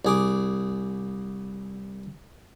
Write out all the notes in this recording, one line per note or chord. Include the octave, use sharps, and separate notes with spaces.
C2 G#4 D6